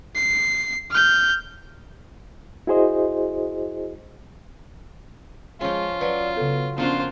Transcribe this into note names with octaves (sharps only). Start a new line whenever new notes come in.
C7
F6 G6
E4 F#4 G#4 C5 D#5
F3 G#3 C#4 F4
F#3 B4 D5
C#3 B3 A4
F3 A#3 B3 C#4 D4 F4 F#4 C5